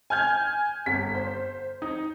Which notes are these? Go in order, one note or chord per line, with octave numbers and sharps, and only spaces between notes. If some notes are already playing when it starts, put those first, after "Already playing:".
G#5 F6 G6 G#6
G1 B6
C5
D#4